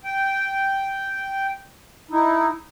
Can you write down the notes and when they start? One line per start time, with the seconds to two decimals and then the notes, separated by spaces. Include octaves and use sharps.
0.04 G5
2.11 D#4 E4